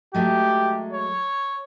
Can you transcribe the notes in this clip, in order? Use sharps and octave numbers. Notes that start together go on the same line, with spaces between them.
F#3 G#3 A3 G4
C#5